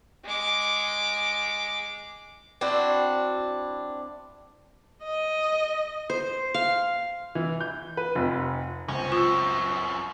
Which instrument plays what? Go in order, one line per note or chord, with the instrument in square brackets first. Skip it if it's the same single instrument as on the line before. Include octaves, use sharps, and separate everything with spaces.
[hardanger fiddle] G#3 D6
[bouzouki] C4 D4 E4 F#4
[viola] D#5
[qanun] C5
F5
[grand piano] E3
G6
B4
F1
[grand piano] C#2 C4 [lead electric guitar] C#4
[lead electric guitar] F#2 [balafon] F4 [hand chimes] C#6 E6